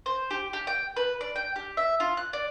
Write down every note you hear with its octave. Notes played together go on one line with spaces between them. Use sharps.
C5
G4
G4
G5
B4
D5
G5
G4
E5
F4
F#6
D5